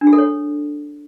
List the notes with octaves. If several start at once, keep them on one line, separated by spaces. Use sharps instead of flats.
D4
G#4
A4
C#5